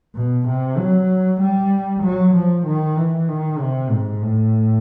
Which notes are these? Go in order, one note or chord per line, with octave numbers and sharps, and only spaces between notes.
B2
C3
F#3
G3
F#3
F3
D#3
E3
D#3
C3
G#2
A2